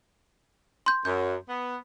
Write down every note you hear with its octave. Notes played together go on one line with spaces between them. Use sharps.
C6 G6
F#2 G6
B3